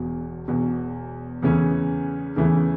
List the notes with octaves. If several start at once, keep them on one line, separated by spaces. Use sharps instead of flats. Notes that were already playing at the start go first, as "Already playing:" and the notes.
Already playing: E1 E2 B2
E1 E2 B2
E2 C#3 E3 A3 C#4
E2 C#3 E3 A3 C#4